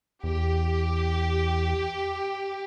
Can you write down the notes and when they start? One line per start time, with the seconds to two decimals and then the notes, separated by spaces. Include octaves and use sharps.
0.24 E2 G4